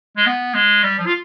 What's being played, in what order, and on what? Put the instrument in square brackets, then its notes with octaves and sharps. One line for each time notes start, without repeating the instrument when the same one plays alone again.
[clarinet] G#3
B3
G#3
G3
F3
F4